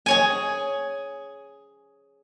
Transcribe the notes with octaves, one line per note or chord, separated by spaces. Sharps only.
G#4 C#5 G#5